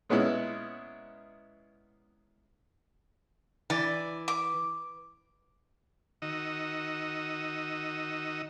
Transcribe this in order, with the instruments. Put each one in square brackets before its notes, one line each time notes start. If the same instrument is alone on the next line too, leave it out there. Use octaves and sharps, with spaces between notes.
[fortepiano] A#2 G#3 B3 C#4 E4
[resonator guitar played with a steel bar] E3 [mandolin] D5
[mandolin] D6
[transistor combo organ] D#3 D#4 F#4 D#5 E6